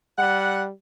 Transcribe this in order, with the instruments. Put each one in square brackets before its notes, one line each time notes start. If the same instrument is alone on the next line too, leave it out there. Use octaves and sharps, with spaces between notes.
[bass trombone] G3 [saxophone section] F#5